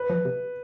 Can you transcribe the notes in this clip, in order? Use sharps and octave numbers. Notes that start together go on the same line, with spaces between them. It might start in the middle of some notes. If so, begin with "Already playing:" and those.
Already playing: B4
F3
C3